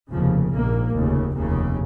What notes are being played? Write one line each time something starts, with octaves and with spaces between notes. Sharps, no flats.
F1 D#2 C#3 F3
A#1 G#2 A#3
F1 D#2 C#3
F1 D#2 C#3